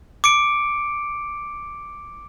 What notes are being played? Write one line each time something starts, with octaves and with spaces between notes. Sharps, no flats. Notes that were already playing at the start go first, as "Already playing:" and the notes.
D6 C#7 D7